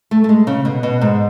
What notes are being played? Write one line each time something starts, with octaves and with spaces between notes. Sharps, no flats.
A3
A3
G#3
C#3
B2
B2
G#2